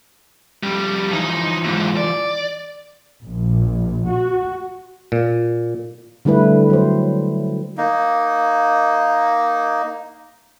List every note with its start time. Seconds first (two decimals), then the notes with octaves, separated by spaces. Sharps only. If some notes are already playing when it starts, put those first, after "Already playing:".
0.63 F2 G3
1.13 E3 F3 D#4
1.64 D#2 G#2
1.97 D5
3.23 A#1
4.06 F#4
5.12 A#2
6.25 D3 G3 A3 E4 B4
6.70 F#3 C5
7.78 A#3 D#4